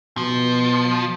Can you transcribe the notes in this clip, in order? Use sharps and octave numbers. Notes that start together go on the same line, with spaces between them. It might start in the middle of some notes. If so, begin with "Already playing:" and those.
B2 F3